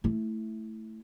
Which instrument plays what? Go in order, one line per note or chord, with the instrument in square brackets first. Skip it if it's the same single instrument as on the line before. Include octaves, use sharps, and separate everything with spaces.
[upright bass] A3 E4